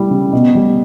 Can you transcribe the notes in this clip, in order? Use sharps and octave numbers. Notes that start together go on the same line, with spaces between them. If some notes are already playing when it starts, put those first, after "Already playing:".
Already playing: G3 E4
C#3
B2
G3